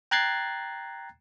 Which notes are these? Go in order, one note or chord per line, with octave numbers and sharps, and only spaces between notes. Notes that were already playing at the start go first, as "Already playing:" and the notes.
G5 A#5 F#6 G#6 A6 C7